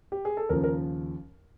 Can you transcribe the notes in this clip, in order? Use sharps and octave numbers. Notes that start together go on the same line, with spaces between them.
G4
G#4
A4
D#2 C#3 F3 A#4
A#4